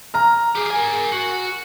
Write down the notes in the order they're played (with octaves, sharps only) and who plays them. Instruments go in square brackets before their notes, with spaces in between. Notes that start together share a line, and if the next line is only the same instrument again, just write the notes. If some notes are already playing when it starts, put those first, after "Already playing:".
[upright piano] A#5 F6
[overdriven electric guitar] G4 G#4
A#4 G#5
F#4